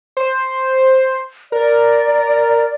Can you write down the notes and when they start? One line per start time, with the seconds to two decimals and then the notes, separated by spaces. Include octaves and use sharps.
0.17 C5
1.52 A#4 D5